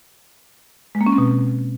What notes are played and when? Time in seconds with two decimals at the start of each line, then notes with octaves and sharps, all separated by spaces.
0.95 G#3
1.01 A#3
1.07 C#4
1.12 C4
1.18 B2